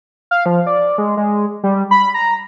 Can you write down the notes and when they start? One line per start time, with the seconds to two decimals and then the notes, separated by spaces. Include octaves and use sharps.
0.31 F5
0.46 F3
0.67 D5
0.98 G#3
1.17 G#3
1.64 G3
1.91 B5
2.14 A#5